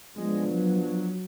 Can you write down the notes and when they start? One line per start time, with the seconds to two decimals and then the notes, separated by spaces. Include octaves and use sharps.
0.17 F3 G#3 B3 D4
0.47 F#3
0.78 F#3